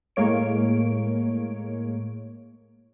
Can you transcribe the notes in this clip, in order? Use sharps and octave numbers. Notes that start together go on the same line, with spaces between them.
A2 G#3 A#3 C#5 D7